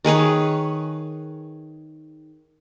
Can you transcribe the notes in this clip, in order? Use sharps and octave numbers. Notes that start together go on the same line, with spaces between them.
D#3 G#4 B4 C#5